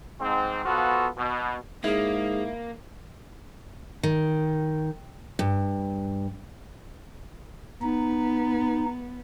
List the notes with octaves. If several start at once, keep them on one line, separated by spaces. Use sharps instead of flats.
G#2 C4
B2 F3 B3 F4 F#4 A4
B2
G#2 A#3 E4 G#4
D#3
G2
B3 D#4